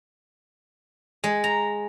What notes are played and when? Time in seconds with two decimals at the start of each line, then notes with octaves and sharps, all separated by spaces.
1.24 G#3
1.44 A#5